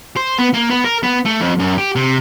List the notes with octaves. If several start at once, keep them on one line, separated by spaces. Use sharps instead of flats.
C5
B3
A#3
B3
A#4
B3
A3
F2
F#2
G4
C3